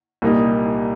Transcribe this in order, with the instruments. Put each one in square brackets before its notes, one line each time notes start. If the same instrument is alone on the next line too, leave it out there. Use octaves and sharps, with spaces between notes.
[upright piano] C2 A#2 G3 A#3 D#4